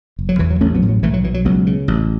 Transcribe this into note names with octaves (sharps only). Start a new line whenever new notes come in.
F#1
F#3
E2 E3
F#3
A1 A3 C#4
F#3 B3
A2
F#3
B1 E3 A3
F#3
B2 E3
F#3
C#2 F#3 B3
C#3
A1